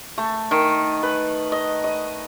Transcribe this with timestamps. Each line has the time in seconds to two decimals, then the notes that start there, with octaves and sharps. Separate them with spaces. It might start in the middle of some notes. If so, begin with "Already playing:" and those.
0.18 A3
0.51 D#3
1.03 B4
1.52 D#5
1.84 D#5